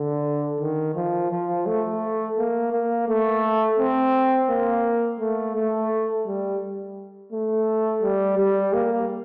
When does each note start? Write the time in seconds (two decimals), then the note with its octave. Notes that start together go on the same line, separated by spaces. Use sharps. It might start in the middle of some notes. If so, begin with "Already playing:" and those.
Already playing: D3
0.60 D#3
0.95 F3
1.31 F3
1.66 A3
2.37 A#3
2.72 A#3
3.08 A3
3.79 C4
4.49 A#3
5.20 A3
5.56 A3
6.26 G3
7.32 A3
8.03 G3
8.38 G3
8.73 A#3